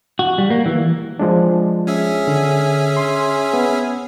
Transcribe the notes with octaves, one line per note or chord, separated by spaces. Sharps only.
F#4
G3
A#3
E3
F3 G#3 D4
C#4 G#4 E5
D3
C6
B3